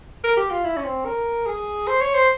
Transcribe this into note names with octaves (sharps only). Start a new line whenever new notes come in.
A#4
G4
F4
E4
C#4
C4
A#4
G#4
C5
C#5
C5